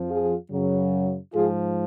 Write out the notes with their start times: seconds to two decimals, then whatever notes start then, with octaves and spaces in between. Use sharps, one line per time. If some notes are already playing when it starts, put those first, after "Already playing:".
Already playing: F2 F3
0.10 F4 G#4
0.51 F#2 C#3 F#3
1.34 G#2 F3 F4 G#4